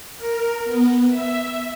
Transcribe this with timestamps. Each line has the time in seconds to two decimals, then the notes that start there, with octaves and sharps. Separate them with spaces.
0.17 A#4
0.65 B3
1.09 E5